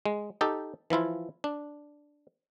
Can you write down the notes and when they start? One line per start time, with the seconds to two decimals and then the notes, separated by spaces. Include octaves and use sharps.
0.06 G#3
0.41 D#4 G4 A4
0.90 E3 F3 E4 F4
1.44 D4